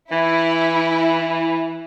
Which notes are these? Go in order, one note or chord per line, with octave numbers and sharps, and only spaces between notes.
E3 E4